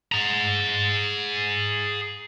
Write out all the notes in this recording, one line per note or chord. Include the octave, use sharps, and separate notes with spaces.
G#4 A#5